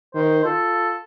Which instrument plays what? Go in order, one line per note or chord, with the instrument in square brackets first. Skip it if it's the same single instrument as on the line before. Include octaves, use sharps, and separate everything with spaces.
[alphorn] D#3 [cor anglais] C5
[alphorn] F4 [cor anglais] A4